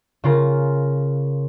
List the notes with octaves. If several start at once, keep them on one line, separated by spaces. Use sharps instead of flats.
C#3 F4 A#4